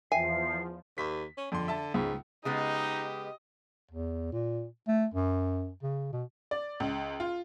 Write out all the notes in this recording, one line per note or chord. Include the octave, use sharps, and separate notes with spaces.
E2 F3 E5 G#5 C7
D#2 B6
C#4
F2 D3 C6
E5 A5
C#2 G#2
C#3 G#3 B3 D#4 G4 D#5
E2
A#2
A3
F#2
C#3
B2
D5
C#2
F4